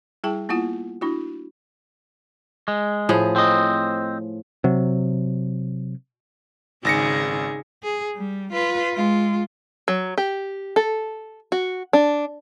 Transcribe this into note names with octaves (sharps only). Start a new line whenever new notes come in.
G3 E4 G#4 G5 A5
A#3 B3 E4 F4 F#5
D4 E4 F#4
G#3
A2 F3 G#4
C4 D#5
C3 F#3
G#1 C#3 D#4 G#4 A#6 C#7
G#4
G3
F4 B4
G#3 F4
F#3
G4
A4
F#4
D4